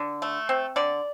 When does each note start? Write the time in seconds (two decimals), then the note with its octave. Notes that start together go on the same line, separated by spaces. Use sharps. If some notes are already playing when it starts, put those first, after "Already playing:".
Already playing: D3
0.22 A3
0.49 C4
0.76 D3 D5